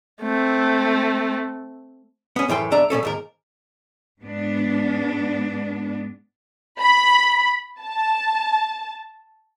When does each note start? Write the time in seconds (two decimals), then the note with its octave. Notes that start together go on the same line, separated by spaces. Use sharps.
0.22 A3 C4
2.36 B3 C#4
2.48 F#2 A2 E3 G5 C6
2.71 B1 G2 D4 E5 A#5
2.90 A#2 E3 C#4 A4
3.03 D#2 G#2 A#4
4.22 G#2 B3 D4
6.81 B5
7.81 A5